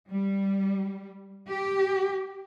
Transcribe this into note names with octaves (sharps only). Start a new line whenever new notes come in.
G3
G4